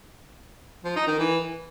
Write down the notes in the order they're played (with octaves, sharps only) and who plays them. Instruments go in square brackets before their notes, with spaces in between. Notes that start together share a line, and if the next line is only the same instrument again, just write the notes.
[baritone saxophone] F3
D#4
D#3
E3